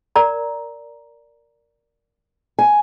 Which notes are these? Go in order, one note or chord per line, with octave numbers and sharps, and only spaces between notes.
A#4 D5 A#5
G#5